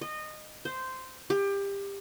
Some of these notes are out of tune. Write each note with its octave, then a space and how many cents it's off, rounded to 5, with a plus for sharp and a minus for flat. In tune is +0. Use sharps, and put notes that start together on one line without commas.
D#5 -20
C5 -10
G4 +25